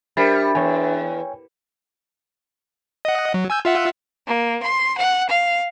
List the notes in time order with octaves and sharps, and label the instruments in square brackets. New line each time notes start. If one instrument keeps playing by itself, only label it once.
[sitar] G3 [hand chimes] D4 E5 A6 [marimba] A#4 C5 B5
[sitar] E2 [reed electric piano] C#5 G5 G#5
[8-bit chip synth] D#5 F#5
F#3
G#5 E6 G6
F4 E5 F#5
[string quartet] A#3
C6
F#5
F5